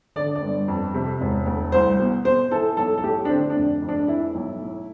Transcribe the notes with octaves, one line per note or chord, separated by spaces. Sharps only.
D3 D5
D5
G1
F2
C3
E1
D2
C2 C5
B2
B2 C5
E3 A4
B1 A4
A4
A2 G4
D4
D3 C4
D4
F1
F2
D4
E3 E4
B1
A2